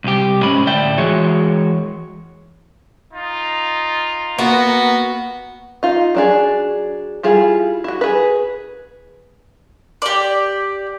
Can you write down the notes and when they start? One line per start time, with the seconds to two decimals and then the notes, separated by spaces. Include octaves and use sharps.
0.04 C2 G4
0.43 G#2 C#4 B5
0.67 D2 A2 D5 E5 G5
0.98 E3 G#3 F#4 G#4 C#5
3.11 D#4 F4
4.39 A#3 B3 F#4
5.83 D#4 F4
6.15 F#3 D4 G#4
7.23 G3 E4 F4 G#4
7.84 E4 F#4
8.01 G#4 B4
10.02 G4 D5